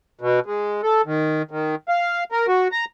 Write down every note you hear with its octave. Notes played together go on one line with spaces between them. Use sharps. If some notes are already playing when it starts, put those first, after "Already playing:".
B2
G#3
A4
D#3
D#3
F5
A#4
F#4
A#5